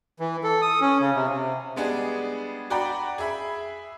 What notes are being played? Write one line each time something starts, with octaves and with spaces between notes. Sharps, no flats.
E3
A4
D#6
C#4
C#3
C3
C3
G3 G#3 B3 D4 G#4
F#4 D5 G5 A#5 B5
G#4 E5 B5